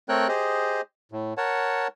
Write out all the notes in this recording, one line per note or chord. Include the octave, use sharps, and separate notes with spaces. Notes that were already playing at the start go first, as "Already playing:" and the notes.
A3 C4 A#4 C#5 G5 F#6
G4 G#4 C5 D#5
A2
A#4 C#5 F#5 A5